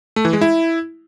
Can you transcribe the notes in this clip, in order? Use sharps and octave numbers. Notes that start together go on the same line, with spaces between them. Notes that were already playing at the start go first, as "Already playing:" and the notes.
A3
E3
G#3
E4